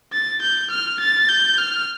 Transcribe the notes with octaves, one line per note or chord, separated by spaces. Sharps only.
A6
G6
F6
A6
G6
F6